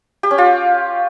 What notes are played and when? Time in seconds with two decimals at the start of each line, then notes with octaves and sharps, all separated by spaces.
0.23 G4
0.31 C#4
0.38 F4